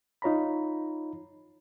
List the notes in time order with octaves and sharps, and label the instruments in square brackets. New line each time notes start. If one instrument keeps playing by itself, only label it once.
[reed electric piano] D#4 F4 C#5 A#5 B5